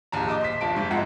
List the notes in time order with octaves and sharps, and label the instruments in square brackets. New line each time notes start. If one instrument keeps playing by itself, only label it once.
[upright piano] A#1 D#2 A5 A#5
D#5 D6
C5 B6
F1 F3 A5 D7
G#2
G1 F2 G#3 E5 F#5 A#5